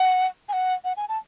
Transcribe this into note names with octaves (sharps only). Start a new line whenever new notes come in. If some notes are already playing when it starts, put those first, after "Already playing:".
Already playing: F#5
G#5
F#5
F#5
G#5
A5